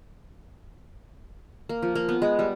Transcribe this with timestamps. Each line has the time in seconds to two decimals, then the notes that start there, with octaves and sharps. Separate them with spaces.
1.69 A#3
1.82 F3
1.95 A#3
2.09 B3
2.22 G#3
2.39 G3